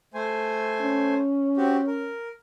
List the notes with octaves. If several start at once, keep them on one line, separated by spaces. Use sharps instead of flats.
A3 C5 G#5
C#4
C4 F#4 G4
A#4